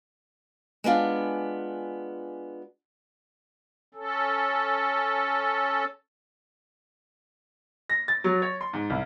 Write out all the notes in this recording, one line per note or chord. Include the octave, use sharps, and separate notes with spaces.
G#3 B3 D4 F4
C#4 A4
A#6
A6
F#3
C#5
C6
G#2
C2